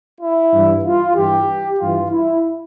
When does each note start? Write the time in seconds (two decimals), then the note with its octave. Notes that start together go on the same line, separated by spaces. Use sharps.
0.20 E4
0.52 G2 E3
0.84 F4
1.16 G2 E3 G4
1.79 G2 E3 F4
2.11 E4